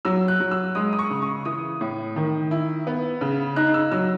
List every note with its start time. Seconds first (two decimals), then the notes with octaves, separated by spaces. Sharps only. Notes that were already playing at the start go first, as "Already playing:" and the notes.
0.05 F#3 E6
0.28 F#6
0.40 F#3
0.51 E6
0.75 G#3 D#6
0.93 D#6
0.99 C#6
1.10 C#3
1.22 C#6
1.45 E3 D#6
1.81 A2
2.16 D#3
2.51 E4
2.87 B3
3.21 C#3
3.56 D#4 F#6
3.74 E6
3.91 F#3 E6